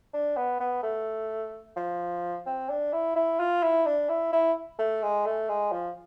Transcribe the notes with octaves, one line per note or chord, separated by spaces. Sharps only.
D4
B3
B3
A3
F3
C4
D4
E4
E4
F4
E4
D4
E4
E4
A3
G#3
A3
G#3
F3